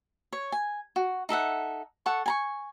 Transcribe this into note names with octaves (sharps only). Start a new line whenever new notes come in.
C#5
G#5
F#4
D#4 A4 E5 F#5
A4 F#5 C#6
G#5 A#5 C#6